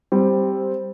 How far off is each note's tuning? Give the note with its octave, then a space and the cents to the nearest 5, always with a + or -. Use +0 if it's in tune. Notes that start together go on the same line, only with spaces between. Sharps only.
G3 +0 C4 +0